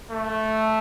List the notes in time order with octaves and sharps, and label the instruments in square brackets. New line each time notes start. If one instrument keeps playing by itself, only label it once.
[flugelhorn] A3